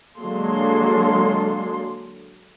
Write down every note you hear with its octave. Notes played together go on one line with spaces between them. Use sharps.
D3 F#3 G#3 A#3 A4 C6